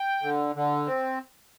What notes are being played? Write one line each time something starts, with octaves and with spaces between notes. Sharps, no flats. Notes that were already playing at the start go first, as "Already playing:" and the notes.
Already playing: G5
D3
D3
C4